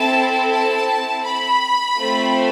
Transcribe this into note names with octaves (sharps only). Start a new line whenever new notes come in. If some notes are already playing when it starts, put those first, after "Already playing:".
Already playing: C4 E4 A4 A5
A5
B5
A3 C4 F4 A4